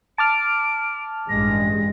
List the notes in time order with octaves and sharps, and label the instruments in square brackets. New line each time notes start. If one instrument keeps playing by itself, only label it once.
[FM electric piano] A5 D6 F6 [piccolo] D7
[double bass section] A1 G2 G#3 [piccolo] A#6